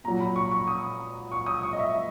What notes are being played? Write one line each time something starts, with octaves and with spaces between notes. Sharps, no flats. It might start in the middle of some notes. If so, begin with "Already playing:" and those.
A#2 F#3 A#5
B5
C#6
C#6
D#6
C#6
D#6
C#6
D#5
E5